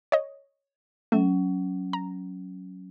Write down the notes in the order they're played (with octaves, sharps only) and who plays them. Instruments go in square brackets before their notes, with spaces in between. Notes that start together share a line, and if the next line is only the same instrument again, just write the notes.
[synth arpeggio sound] C#5 D#5
[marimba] F#3 C#4 [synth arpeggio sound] A3
[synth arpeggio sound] A#5